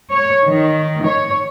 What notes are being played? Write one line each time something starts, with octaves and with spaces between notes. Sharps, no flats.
C#5
D#3
C#5